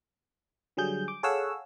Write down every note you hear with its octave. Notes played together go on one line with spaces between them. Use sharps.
D3 F#3 G3 G#4 G6
D6
G#4 A4 C#5 F5 F#5 E6